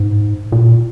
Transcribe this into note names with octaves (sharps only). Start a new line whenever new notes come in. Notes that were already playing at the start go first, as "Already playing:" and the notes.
Already playing: G#2
A#2